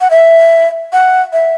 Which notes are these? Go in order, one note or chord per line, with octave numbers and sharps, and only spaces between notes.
F#5
E5
F#5
E5